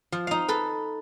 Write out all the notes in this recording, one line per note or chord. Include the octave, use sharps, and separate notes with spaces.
F3
D#4 F5
A4 B4